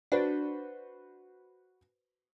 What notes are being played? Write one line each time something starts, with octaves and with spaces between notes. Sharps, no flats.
D4 F#4 B4 C5